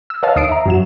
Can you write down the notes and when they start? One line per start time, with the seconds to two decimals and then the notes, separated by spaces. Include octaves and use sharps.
0.10 E6
0.23 B4 C#5 D#5 F5 A5
0.36 D#2 D#6 C7 D7
0.49 E5 A#5
0.66 F#2 F#3 E7